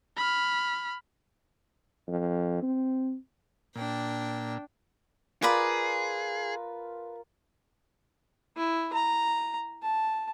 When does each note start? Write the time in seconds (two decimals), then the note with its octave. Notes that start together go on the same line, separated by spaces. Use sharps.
0.17 B5 F6
2.08 F2
2.62 C4
3.76 A#2 D4 G5
5.42 F4 G#4 A#4 B4 D5 A5 B5
8.57 E4
8.93 A#5
9.83 A5